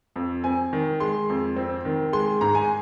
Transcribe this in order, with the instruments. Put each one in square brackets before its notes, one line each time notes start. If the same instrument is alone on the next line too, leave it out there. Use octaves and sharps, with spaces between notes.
[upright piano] F2
C4 G#5
D#3
G#3 C6
F2
C4
D#3
G#3 C6
G#2 A#5
G#5